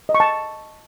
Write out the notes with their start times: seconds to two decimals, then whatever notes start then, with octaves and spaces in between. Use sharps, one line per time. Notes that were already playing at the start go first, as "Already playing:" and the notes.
0.09 D#5
0.15 C#6
0.20 A5